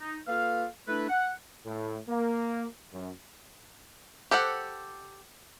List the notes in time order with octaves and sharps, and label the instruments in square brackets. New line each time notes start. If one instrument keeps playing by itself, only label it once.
[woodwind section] D#4
A#3 F4 A4 B4 F5
A3 D4 E4 A4 B4
F#5
[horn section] A2
A#3
F#2
[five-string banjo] G4 A4 C5 F#5